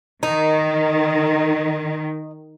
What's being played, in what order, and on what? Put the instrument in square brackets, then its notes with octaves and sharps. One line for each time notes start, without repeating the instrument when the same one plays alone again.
[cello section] D#3 [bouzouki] D#4